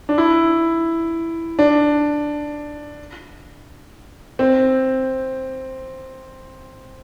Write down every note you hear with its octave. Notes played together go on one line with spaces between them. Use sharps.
D4
E4
D4
C4